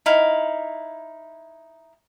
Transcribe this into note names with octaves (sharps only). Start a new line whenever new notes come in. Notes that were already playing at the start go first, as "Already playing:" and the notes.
D#4 E4 F5